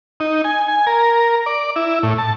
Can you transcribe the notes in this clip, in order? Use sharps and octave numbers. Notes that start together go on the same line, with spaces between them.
D#4
G#5
G#5
A#4
D5
E4
A2
A5